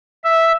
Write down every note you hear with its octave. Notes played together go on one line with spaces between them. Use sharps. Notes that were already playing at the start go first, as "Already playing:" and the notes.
E5